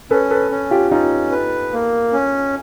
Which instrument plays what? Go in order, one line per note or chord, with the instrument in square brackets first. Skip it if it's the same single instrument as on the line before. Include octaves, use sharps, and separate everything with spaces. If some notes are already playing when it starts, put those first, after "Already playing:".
[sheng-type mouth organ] C#4 [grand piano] A4 B4
[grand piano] A4 B4
[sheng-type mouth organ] C#4
[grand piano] F4 G4
[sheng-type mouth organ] C#4 [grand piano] D#4 F4
[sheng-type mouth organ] B4
A#3
C#4